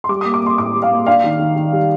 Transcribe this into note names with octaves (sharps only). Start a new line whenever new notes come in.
C6
G3 D6
D#6
A#3
D6
A#3 C6
A2 D6
G3
F5
A#3
D4 F5
D#3
D#3
D#3
G3